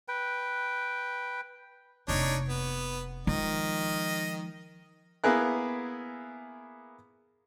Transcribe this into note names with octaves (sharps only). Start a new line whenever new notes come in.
B4 G5
F1 A#3 D4 D#4 C#5
B3
D#3 F3 G#3 D#5
A#3 B3 E4 G#4 A#4 F#6